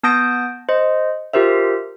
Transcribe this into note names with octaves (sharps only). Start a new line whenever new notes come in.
B3 A5 D#6 G6 A#6 D7
C5 D#5
F4 G4 A#4 C5 E5